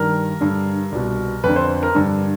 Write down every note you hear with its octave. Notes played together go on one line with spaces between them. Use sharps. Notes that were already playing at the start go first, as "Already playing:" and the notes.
Already playing: G2 D#3 A#4
G2 D3
C2 B2
F2 D3 B4
C5
A#4
G2 D3